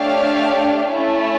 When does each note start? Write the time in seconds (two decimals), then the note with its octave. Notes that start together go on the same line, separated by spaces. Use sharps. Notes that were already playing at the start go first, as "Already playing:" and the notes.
Already playing: A3 D4 G4 C#5 F5
0.91 A3 C#4 E4